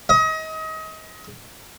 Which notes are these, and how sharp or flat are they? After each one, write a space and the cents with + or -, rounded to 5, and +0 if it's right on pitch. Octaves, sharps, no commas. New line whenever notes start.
D#5 +30